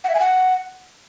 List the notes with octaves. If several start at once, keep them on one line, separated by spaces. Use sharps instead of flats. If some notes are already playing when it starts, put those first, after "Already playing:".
F#5
E5
G#5
F#5